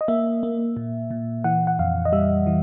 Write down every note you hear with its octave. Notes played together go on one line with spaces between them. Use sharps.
D#5
A#3 E5
A#3
A#2
A#2
E3 F#5
F#5
F2 F5
D#5
G3 E5
E3